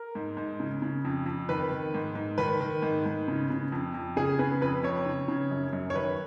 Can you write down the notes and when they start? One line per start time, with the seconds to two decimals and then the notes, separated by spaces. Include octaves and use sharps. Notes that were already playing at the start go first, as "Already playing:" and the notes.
Already playing: A#4
0.15 G#2
0.37 G#2
0.60 C#3
0.82 C#3
1.05 F2
1.26 F2
1.49 D#3 B4
1.71 D#3
1.94 G#2
2.15 G#2
2.38 D#3 B4
2.61 D#3
2.82 G#2
3.06 G#2
3.28 C#3
3.50 C#3
3.72 F2
3.94 F2
4.16 C#3 G#4
4.39 C#3 B4
4.61 F2 B4
4.83 F2 C#5
5.06 C#3
5.28 C#3
5.51 F#2
5.73 F#2
5.90 C#5
5.95 D#3 B4